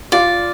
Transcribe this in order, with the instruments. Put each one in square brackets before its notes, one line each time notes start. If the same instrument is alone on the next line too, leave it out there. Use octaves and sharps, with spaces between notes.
[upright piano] F4 [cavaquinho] D5